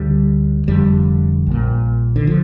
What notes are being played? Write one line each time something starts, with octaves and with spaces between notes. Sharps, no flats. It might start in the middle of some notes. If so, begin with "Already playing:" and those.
Already playing: D2 D3 G3
F1 F2 D3 G3
A#1 A#2
D3
D3 F3